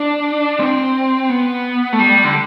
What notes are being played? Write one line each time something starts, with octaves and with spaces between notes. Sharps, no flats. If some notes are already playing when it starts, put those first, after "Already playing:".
Already playing: D4
C4
B3
A3
G3
D3